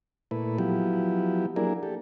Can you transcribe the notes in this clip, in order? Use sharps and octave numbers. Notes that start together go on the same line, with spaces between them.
A#2 A3 E4 B4
F3 F#3 B3 E4 G4
F#3 A#3 D4 E4 G#4 A#4
G4 A4